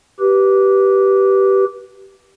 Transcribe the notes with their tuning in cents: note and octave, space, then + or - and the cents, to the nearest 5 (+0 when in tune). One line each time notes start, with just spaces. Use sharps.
G4 -15 B4 -15